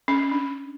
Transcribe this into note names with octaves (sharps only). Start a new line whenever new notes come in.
C#4
D4